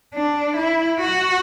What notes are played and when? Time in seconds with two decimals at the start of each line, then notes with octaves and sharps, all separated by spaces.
0.15 D4
0.57 E4
1.01 F#4